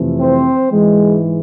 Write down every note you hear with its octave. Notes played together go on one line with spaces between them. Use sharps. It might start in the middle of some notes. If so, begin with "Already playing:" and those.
Already playing: F2 C3 E3 A3
C4 C5
G#2 E3 G#3